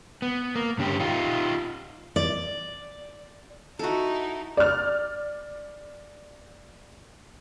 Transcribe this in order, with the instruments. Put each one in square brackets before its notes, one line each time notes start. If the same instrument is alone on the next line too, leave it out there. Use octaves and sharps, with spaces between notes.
[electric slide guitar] B3
A#3
G2 D3 C#4 G4
D#4 F4 G4
[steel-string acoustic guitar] D5
[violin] D#4 E4 [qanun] F#4 A4
[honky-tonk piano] D5 F6